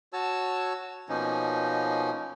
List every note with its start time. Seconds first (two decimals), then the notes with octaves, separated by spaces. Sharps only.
0.13 F#4 C#5 A5 E6
1.09 B2 F3 A#3 C#4 D#4